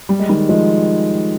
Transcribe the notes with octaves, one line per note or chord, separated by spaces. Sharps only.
G3
G#3
D#3 G3
F3 G#3